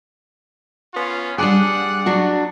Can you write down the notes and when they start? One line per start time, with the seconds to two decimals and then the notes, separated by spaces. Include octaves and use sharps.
0.94 B3 C#4 F4
1.38 G3 D4 G#4 D5 F#5
2.06 F#3 D4 F#4